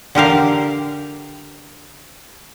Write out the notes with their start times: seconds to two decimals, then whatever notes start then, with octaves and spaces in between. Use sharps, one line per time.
0.15 D3 G4 A#4 F5